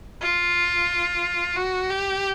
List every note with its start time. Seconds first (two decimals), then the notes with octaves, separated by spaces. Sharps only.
0.22 F4
1.56 F#4
1.91 G4